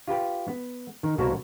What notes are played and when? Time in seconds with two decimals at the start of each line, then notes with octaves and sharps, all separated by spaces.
0.07 F4 G4 B4 G5
0.48 B3
1.03 D#3
1.18 C2 B2 A#3 F#4 C5 A5